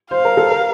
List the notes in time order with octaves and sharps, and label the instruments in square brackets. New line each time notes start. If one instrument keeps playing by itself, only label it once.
[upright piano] C5 [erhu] F5
[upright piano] A#4
A4
A#4